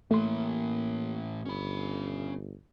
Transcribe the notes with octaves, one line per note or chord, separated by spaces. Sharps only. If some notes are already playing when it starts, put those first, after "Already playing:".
A2 E3 A3 A#3 C6
G1 C#4 B5